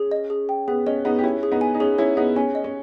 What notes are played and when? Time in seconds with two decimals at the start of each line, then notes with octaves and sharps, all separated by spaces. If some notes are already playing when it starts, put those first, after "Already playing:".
Already playing: C#4 G#4
0.11 D#5
0.30 G#4
0.49 G5
0.68 B3 G#4
0.86 C#4 D#5
1.05 B3 D#4 G#4
1.19 G4
1.23 C#4 E4 C#5
1.43 G#4
1.51 B3 D#4
1.61 G#5
1.75 D#4
1.80 C#4 G#4
1.98 C#4 E4 C#5
2.17 B3 D#4 G#4
2.36 C#4 G#5
2.55 D#5
2.64 C#4